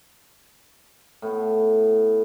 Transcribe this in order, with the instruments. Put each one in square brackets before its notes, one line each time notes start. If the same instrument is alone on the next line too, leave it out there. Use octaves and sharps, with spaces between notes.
[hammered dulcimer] A2 B3